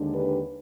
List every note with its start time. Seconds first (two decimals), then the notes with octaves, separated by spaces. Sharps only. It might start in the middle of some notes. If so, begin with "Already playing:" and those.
Already playing: D#2 D3 G#3 D4
0.14 G4 B4